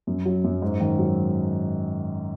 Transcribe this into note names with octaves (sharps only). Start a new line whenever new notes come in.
F#2
F#3
F#2
G#2
D#3
F#3